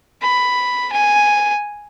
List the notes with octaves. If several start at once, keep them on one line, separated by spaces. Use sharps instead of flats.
B5
G#5